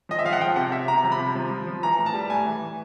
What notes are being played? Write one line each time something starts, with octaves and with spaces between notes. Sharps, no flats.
F3 D#5
E5
F3 F5
F#5
F3 G5
C3 F#5
C3 E5
C3 A#5
F3
B5
C3
F3
F3
F3
E3 A#5
A2
A5
G3
A2 G#5
E3
E3